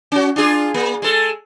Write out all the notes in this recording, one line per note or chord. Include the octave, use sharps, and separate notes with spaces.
C#4 F#4
D4 F4 G#4
A#3
G#3 A4